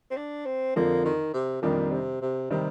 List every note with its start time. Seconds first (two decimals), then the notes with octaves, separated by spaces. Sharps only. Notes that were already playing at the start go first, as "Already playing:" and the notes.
0.11 C4
0.17 D4
0.46 C4
0.76 F2 D3 F3 A#3
1.05 D#3
1.34 C3
1.62 F2 A#2 D#3 G3 D4 G4
1.92 C3
2.22 C3
2.50 C3 D#3 G3